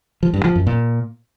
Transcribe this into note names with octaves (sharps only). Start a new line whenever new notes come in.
F3
G2
F3
F#2
A#2